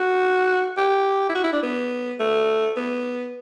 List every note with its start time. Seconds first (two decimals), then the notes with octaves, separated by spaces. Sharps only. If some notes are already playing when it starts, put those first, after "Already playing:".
Already playing: F#4
0.78 G4
1.29 E4
1.35 F#4
1.44 E4
1.53 D4
1.63 B3
2.20 A3
2.77 B3